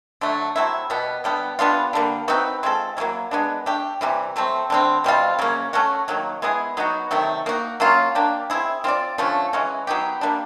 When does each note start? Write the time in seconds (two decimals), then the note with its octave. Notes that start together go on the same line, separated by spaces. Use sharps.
0.21 D3 F#3 A3
0.56 F#3 A3 C4 E4
0.90 B2 G3 B3
1.24 D3 G3 B3
1.59 G3 B3 D4 F4
1.93 D3 G3 A#3
2.28 C4 D#4 F#4 B4
2.63 G#3 C4 F4 A4
2.97 F#3 A#3 C#4 E4
3.31 G#3 B3 D4
3.66 A3 D4 G4
4.01 C3 E3 G3
4.36 F#3 A3 C4
4.70 D3 G3 C4
5.04 B2 G3 C4 F4
5.39 C#3 F#3 A#3 C#4
5.73 A3 C#4 F#4
6.08 D#3 F#3 A#3
6.42 G#3 B3 E4 G#4
6.77 F#3 B3 D#4 F#4
7.11 C3 D#3 F#3 A3
7.46 A#3 D#4 F#4
7.80 F#3 A#3 C#4 F4
8.15 A#3 D4 G4
8.50 C4 E4 G#4
8.84 C4 F4 A4 D5
9.18 D3 F3 A3 C#4
9.53 E3 G#3 C#4 F#4
9.87 F#3 B3 D#4 G4
10.21 G3 A#3 D4